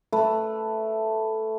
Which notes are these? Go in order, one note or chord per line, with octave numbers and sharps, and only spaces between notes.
A3 B4